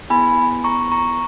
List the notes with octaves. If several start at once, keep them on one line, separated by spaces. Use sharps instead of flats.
B3 E4 G#4 G#5 B5
A#5 C#6
A#5 C#6